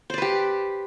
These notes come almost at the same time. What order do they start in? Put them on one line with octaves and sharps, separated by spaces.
C5 D5 B4 G4